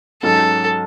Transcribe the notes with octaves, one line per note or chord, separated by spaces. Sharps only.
G#2 F#3 C#4 A4